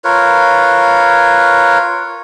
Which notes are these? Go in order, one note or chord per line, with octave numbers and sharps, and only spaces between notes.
F4 A#4 B4 C#5